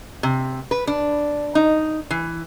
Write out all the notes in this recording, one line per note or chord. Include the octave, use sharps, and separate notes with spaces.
C3
B4
D4
D#4
E3